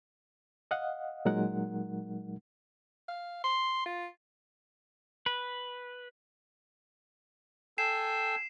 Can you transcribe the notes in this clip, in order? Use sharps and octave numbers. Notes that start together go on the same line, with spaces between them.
D#5 F5 F#5
A#2 F#3 G#3 D#4 A#4 F#5
F5
C6
F4
B4
A4 G5 G#5 C7 E7